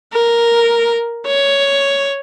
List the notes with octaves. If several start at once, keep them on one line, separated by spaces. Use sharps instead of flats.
A#4
C#5